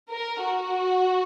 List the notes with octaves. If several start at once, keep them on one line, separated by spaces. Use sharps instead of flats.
A#4
F#4